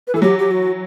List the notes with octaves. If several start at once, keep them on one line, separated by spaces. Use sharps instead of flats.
B4
E3 A4
F#3 G4
G4
F#4